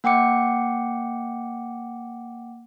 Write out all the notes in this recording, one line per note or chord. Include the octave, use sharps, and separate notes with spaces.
A#3 F#5 G5 D6 C#7